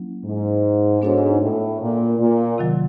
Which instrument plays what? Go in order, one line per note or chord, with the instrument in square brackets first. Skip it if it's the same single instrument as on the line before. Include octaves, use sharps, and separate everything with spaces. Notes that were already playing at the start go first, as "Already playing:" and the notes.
Already playing: [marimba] F#3 A#3 C#4 E4
[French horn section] G#2
[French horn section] G#2 [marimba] B3 D4 F#4 A4 C#5
[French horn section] A2
A#2
A#2
[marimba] C3 D#3 F#3